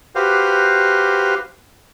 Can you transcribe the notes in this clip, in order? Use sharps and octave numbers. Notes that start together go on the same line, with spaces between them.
F#4 G4 B4 C5 F5